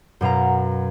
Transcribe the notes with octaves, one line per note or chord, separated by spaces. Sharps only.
F#2 B2 F5 A#5